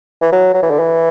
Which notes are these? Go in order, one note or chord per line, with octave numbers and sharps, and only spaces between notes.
E3
F#3
F#3
E3
D3
E3